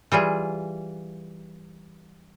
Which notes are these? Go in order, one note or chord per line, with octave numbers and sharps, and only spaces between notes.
E3 G3 F4 G#4